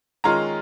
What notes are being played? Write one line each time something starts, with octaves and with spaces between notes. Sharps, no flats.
D#3 G#3 C#4 F4 A#5